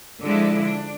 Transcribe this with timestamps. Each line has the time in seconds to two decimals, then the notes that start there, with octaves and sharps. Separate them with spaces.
0.22 D3 F3 G#3 D4 E4
0.62 D4